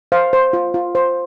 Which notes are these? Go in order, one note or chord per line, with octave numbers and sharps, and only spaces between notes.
C5 F5
C5
F4
F4
C5